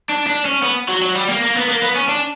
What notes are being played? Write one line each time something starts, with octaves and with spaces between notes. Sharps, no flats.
D4
D4
C#4
B3
F#3
F#3
G3
A#3
A#3
B3
A#3
B3
C#4
D4